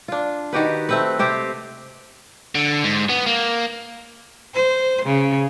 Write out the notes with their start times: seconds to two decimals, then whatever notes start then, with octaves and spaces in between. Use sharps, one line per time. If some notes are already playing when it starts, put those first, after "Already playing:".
0.08 D4 F4
0.53 D#3 F#4 G4 B4
0.89 A3 C4 B4
1.19 C3 C4 G4 C5
2.55 D3
2.84 G#2
3.09 B3
3.26 A#3
4.54 C5
5.05 C#3